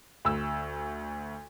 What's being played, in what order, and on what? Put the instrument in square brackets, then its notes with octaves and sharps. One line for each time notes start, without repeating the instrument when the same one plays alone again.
[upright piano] D2 E6